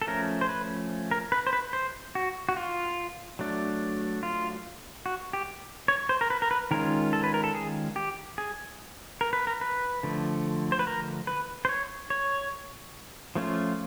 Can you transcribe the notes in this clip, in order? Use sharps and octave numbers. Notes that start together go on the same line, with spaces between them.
A4
F3 A3 C#4 A#4
C5
B4
A#4
B4
C5
B4
C5
F#4
F#4
F4
F#3 A3 D4
F4
F#4
G4
C#5
C5
A#4
B4
A#4
B4
D#3 G#3 C#4 F4 A#4
A4
B4
A#4
A4
G#4
G4
G#4
A#4
B4
A#4
B4
D3 F3 A3
C5
B4
A#4
B4
C5
C#5
C#5
F3 A3 C#4 F4